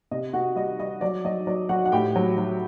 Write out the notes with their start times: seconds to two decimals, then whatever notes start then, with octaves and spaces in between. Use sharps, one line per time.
0.11 C3 D#5
0.33 C3 F#4 F#5
0.56 G3 D#5
0.79 G3 D#5
1.01 F#3 D5
1.25 F#3 D#5
1.47 F#3 D5
1.69 F#3 F#4 F#5
1.85 F#5
1.92 A2 G4 G5
2.16 F#3
2.38 F#3